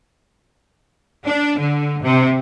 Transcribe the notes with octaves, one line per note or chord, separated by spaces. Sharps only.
D4
D3
C3